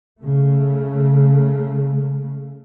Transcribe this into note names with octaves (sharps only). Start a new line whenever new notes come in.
C#3 A3